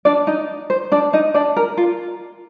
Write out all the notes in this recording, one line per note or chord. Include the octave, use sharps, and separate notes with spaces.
D4 D5
D#4 D#5
C5
D4 D5
D#4 D#5
D4 D5
A#4
F4